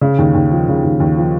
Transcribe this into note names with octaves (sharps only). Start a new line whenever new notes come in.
C#3
D#2
D#2
F3
C#3
D#2
D#2
F3